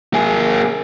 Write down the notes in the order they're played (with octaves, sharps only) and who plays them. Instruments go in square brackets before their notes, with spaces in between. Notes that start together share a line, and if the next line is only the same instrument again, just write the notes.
[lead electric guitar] A#3 G#4